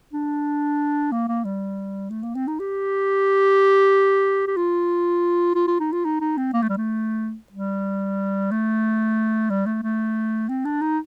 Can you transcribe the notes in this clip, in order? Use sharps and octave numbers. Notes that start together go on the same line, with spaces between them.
D4
A#3
A#3
G3
A3
A#3
C4
D#4
G4
G4
F4
F4
F4
D#4
F4
D#4
D#4
C4
A#3
A3
G3
A3
G3
A3
G3
A3
A3
C4
D4
D#4